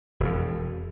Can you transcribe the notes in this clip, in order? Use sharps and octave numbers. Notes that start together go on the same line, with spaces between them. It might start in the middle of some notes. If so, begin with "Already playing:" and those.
E1 F2